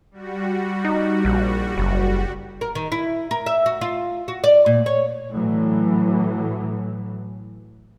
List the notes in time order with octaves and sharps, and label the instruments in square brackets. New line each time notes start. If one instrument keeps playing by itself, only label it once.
[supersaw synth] G3 F#4
[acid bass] D#4
A#1
F#1
[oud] A#4
D#3
E4
A#4
E5
F#4
F4
F#4
D5
A#2
C#5
[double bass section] A2 E3 F#3